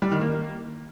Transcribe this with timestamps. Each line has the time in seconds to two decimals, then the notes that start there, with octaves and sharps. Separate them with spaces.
0.02 G3
0.12 D#3
0.21 A#3